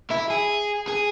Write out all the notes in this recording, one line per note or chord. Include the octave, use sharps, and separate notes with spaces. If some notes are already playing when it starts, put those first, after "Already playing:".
E4
G#4
G#4